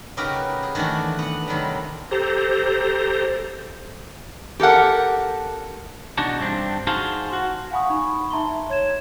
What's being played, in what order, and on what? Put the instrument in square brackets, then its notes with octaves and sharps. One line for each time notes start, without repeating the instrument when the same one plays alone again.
[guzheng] C#3 D#4 F#4 G4 A#4 B4
G#4
D#3 E3 A3 D4 F#4
B3 F#5
C3 D#3 F#3 G3
[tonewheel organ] G4 A4 C5 A#5
[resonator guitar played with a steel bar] G4 A4 A#4 F#5
[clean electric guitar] E2 B2 D4 D#4 F#4 A5
G2 C4 D4
D#4 F#4 G#4 C5 F5 A5
F#4
[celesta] F5 F#5 G#5 B5 C#6 D#6
D#4 B5 C#6
D#4 E5 A5 A#5 C6 G7
C#5 G#6 E7